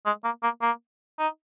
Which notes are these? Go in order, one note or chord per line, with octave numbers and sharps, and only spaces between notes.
G#3
A#3
A#3
A#3
D#4